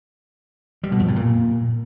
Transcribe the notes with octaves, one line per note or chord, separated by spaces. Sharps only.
G3
B2
F2
A2
A#2